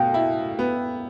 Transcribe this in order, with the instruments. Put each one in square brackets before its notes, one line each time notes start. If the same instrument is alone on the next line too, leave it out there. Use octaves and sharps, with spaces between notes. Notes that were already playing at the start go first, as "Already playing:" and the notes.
Already playing: [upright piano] B2 [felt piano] F5 G5
[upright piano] E4
B3